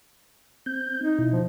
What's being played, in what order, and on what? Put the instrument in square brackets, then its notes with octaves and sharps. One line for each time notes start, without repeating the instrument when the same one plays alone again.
[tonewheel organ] C4 G6
[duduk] D#4
[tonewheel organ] B2 E4
[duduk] F3